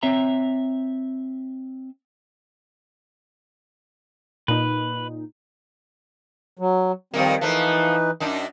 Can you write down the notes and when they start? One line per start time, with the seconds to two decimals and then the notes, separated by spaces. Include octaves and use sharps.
0.03 C4 C#5 E5 A#5
4.48 A#2 D#4 B4
6.59 F#3
7.14 F2 D#3 G3 A#3 C4
7.41 E3 F3 A3 D#4 B4
8.20 F#2 D4 D#4